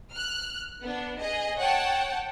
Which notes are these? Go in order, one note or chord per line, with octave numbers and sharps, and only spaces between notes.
F6 F#6
B3 D4
G#4 D#5
C#5 F#5 G5 A5